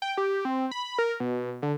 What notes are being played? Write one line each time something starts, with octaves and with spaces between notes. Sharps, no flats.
G5
G4
C4
B5
A#4
B2
D3